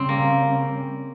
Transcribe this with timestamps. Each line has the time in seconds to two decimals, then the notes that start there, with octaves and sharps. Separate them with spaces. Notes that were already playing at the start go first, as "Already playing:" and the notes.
Already playing: C#3 G3 C4 C#4
0.09 A#3